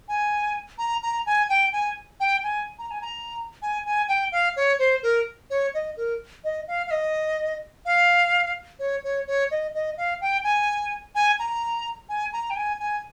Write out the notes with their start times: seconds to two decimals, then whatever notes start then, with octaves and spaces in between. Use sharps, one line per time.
0.08 G#5
0.78 A#5
1.03 A#5
1.26 G#5
1.49 G5
1.73 G#5
2.20 G5
2.44 G#5
2.79 A#5
2.91 G#5
3.02 A#5
3.62 G#5
3.86 G#5
4.08 G5
4.32 F5
4.56 C#5
4.79 C5
5.03 A#4
5.50 C#5
5.74 D#5
5.97 A#4
6.44 D#5
6.68 F5
6.86 F5
6.91 D#5
7.85 F5
8.79 C#5
9.04 C#5
9.27 C#5
9.51 D#5
9.74 D#5
9.97 F5
10.21 G5
10.44 G#5
11.15 G#5
11.39 A#5
12.09 G#5
12.33 A#5
12.50 G5
12.56 G#5
12.80 G#5